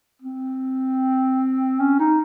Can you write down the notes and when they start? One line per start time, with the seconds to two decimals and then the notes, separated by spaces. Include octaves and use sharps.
0.22 C4
1.80 C#4
1.99 D#4